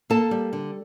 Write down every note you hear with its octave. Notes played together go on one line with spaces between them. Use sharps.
A#3 A4 A5
G3
D3